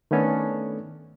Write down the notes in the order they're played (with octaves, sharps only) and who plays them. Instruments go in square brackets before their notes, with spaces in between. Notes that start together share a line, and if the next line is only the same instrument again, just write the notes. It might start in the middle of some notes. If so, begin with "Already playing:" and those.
[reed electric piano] D#3 A3 B3 C#4 D4 A4